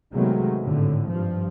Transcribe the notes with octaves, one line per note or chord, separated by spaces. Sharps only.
C3 D#3 F#3 G#3 A3 B3
G#1 A2 D3
G2 F3